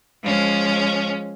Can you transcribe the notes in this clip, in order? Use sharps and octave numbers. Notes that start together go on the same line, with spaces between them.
F3 G#3 C#4